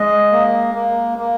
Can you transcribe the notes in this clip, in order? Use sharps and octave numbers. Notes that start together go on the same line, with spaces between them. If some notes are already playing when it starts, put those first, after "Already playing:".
Already playing: G#3 D#5
A#3
A#3
A#3